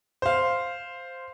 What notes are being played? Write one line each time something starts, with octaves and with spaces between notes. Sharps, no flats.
C5 F5